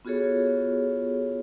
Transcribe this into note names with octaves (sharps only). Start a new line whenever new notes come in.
B3 F4 F#4 G#4 A4 C#5